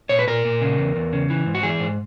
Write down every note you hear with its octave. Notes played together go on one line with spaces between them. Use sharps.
A#2 C#5
B4
A#2 A#4
A#2
C#3
E2
E2
C#3
E3
G#2
F#4
E3 G#4
G#2